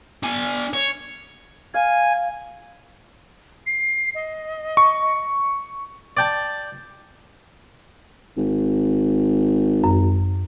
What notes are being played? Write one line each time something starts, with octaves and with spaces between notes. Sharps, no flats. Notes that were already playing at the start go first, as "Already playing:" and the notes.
D4 G#5
C#5
F5 G#5
C7
D#5
C#6
D5 G5 A5
G#1
F#2